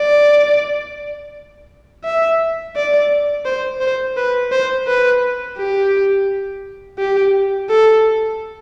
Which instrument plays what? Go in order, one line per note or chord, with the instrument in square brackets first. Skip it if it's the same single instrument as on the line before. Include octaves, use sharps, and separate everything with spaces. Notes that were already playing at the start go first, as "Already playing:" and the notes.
Already playing: [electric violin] D5
E5
D5
C5
C5
B4
C5
B4
G4
G4
A4